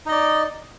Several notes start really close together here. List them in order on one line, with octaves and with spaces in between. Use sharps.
D#4 D#5 D5